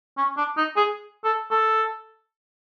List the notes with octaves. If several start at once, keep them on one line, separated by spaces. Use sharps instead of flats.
C#4
D4
D#4
G#4
A4
A4